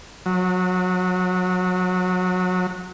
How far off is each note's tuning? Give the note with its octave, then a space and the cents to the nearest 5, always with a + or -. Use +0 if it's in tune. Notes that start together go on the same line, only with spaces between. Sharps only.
F#3 -25